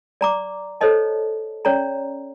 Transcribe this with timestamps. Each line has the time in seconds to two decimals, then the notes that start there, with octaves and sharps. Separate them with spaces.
0.21 D5 A#5 D6
0.81 A4 C5 C#5 D#5 A5
1.65 C#4 C#5 D5 A#5